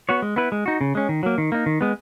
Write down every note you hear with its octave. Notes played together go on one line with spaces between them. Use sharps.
B3 F#4 C#5
G#3
B3 E4 B4
G#3
D#4 F#4
C#3
G#3 C#4
D#3
F#3 A#3
D#3
A#3 D#4
D#3
G#3 B3